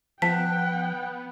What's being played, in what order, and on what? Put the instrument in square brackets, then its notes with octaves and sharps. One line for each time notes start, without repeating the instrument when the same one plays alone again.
[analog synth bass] F3 [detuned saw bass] B3 [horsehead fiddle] F#5 G5 [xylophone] A5 B6